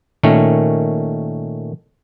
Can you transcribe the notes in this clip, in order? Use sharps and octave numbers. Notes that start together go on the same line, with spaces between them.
A#2 D#3 A3 C#4